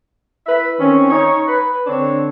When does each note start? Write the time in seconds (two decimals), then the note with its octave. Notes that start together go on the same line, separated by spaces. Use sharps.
0.47 E4 B4 E5
0.79 D#3 C4 C#4
1.10 D#4 C#5
1.47 B4
1.87 D3 C4 D4 C#5